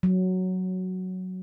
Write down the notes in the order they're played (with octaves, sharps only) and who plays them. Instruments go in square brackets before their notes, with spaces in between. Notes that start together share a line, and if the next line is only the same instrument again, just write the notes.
[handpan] F#3